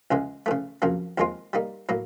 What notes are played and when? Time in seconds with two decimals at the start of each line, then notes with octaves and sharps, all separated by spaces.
0.11 C#2 C#3 E3 G#3
0.46 C#3 E3 A3
0.82 F2 C#3 F#3 A#3
1.18 D#2 D#3 G#3 C4 F4
1.53 G3 A#3 D#4
1.89 A2 F#3 A#3